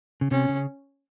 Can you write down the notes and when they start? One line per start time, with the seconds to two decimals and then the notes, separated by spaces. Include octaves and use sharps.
0.21 C#3
0.31 C3 C#4
0.49 C#3